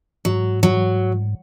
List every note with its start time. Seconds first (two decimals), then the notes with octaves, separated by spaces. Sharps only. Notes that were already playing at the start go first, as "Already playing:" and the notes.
0.25 G#2 F#3
0.63 F#3